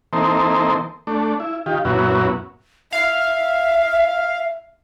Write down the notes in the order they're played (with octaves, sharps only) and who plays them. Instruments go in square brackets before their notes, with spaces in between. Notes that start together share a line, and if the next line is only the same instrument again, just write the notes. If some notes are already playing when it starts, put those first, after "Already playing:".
[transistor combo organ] E3 A#3 C4 D#4 A4 C5
A3 D4
E4
D#3 F4 G4
F#2 A#2 B3 C#4 E4 F#4
[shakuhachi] E5 [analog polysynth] F5